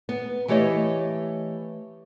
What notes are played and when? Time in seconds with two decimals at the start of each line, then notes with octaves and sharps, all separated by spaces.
0.09 B3
0.48 E3 A3 G4 C#5 D#5